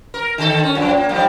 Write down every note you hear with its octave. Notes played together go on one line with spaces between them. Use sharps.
A#4
D3 A4
C#4
F#2 F3
A#3
G2 F3 G3